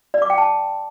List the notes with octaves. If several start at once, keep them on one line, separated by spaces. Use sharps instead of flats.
D5
D6
G5
A5